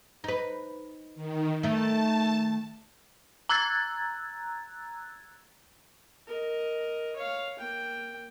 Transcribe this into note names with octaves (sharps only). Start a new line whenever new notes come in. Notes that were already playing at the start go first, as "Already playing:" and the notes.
D#4 B4
D#3
D#3 A3 A5
A#5 E6 F#6 G#6 A6
A#4 D#5
C#5 F5
A#3 G5